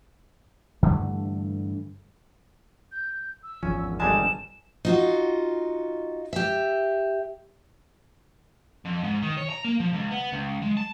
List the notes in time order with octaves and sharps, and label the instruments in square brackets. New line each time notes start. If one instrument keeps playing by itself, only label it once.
[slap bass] G2 D3 E3 A3
[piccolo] G6
E6
[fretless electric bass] G#1 E2 F3 [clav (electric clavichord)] C#4
[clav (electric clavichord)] G1 G3 G#3 [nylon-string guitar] G#5 A5 [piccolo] E7
[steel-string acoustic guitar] D#4 F4 F#4
G4 E5
[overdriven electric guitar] F2
G#2
D#3
C#5
A#5
A#3
F3
C#2
B3
C#2
G#3
A5